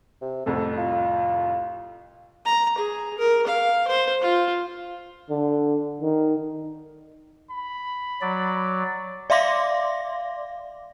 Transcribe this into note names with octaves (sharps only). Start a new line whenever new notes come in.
C3
C2 F2 A2 A4
F4
A#5
G#4
A#4
F5
C5
F4
D3
D#3
B5
F#3 D5
D5 E5 F5 C6 D6 A#6